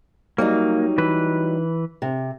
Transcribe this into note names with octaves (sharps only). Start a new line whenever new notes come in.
F#3 G3 A#3 D#4
E3 B4
C3